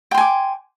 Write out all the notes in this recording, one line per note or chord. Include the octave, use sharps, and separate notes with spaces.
G5 G#5 C6 D6